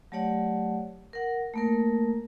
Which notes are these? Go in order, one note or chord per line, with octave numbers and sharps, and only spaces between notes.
F#3 A3 G4 C#5 D5 F#5
A#4 F#5
A3 A#3 A#4